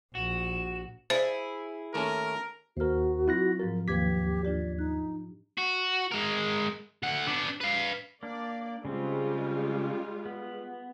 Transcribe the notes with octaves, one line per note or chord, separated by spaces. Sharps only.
A#1 F#4 E7
E4 G#4 C5
D#2 A3 C#4 A#4
D#2 F#4 A#4 C5 F6
F#3 C4 E4 F4 F#6 A#6
G#2 F3 A#4 A6
D#2 F3 G4 B4 D6 G#6 B6
D4 F4 G4 D5
D#4 F#6
F#4
G#3 A#4
D2 F#5
B3 D4
B4 F5
A#3 D4 D5
C#3 G3 G#3 C4 F4
B3